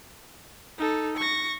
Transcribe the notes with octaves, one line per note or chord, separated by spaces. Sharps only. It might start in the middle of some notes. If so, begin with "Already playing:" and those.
D#4 A4
C#6 A#6